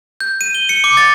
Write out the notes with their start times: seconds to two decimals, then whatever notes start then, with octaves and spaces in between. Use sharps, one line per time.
0.20 G6
0.41 D#7
0.55 G7
0.69 C#7
0.84 D6
0.97 A6